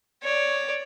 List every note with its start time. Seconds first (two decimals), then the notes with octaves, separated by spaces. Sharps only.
0.23 C#5 D5